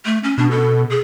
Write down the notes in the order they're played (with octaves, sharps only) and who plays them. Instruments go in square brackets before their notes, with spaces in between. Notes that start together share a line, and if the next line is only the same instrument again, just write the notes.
[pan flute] A3
C#4
[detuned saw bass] B2 [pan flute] D4
[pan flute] A4
G#4